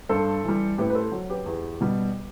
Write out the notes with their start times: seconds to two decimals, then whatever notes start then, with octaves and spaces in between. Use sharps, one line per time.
0.09 G2 A4 C5
0.43 E3 G3
0.78 A2 G4 B4
0.90 B4
0.95 A4 C5
1.12 F#3
1.30 G4 B4
1.46 E2
1.81 B2 G3